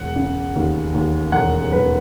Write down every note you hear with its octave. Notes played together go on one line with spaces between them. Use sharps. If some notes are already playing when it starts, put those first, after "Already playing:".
Already playing: E1 F#5
C#3
D#2
D#2
E1 F#5
E1 B4